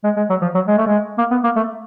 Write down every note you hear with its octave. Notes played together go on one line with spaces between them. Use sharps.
G#3
G#3
F#3
F3
F#3
G#3
A3
G#3
A#3
B3
A#3
A3